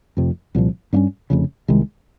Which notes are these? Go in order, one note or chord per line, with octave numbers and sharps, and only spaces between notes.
F1 F2 C3
C2 A#2 F3
G2 G3 A#3 C#4
F1 F2 C#3
C2 C3 D#3 G#3